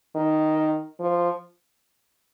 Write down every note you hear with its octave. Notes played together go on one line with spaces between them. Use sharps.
D#3
F3